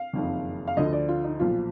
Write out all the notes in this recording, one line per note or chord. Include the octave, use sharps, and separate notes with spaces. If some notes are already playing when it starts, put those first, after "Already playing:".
Already playing: F5
F#1 F2 D#3
F5
D2 D3 F3 D#5
D5
F4
D#4
B1 A#2 F3 F4